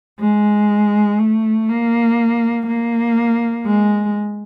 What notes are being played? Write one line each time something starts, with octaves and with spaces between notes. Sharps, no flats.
G#3
A3
A#3
A#3
G#3